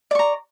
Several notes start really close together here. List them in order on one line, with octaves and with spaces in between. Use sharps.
D5 C#6 A#5